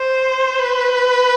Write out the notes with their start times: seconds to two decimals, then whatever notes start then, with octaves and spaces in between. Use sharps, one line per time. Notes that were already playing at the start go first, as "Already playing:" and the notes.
Already playing: C5
0.59 B4